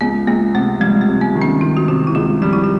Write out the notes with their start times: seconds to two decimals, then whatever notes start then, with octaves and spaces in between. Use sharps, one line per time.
0.01 C#2 B3
0.27 C#2 A#3
0.54 C3 A3
0.81 G3 G#3
1.01 A3
1.08 C3
1.21 B3
1.35 D#3
1.42 C#4
1.61 D#3 D#4
1.77 F#4
1.88 C3 F4
2.07 E4
2.15 C#2 F4
2.42 G3 F4
2.53 E4
2.64 F4